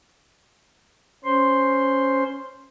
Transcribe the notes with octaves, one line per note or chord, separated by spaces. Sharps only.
C#4 C5 C6